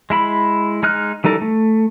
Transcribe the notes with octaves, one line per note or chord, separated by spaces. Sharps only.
G#3 E4 B5
G#3 D#4 F6 F#6
E3 G3 D#4 A4 A#4
A3